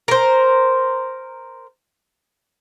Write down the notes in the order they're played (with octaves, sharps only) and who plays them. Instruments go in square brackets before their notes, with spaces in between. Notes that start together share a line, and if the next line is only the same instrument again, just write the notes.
[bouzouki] A#4 C5